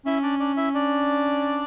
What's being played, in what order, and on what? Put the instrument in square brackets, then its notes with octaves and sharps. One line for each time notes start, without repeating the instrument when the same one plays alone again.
[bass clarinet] C#4 [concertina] E4 E5
[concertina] D4 D5
D4 D5
E4 E5
D4 D5